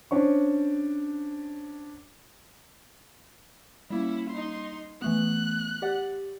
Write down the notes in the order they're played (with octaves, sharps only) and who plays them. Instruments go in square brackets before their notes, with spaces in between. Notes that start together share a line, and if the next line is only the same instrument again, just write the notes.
[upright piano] C#4 D4 C5 C#6
[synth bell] G3 A#3 [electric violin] C#4 E4
[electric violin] D#4 C6
[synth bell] E3 A3 B3 [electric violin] F#6
[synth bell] G4 D5 F#5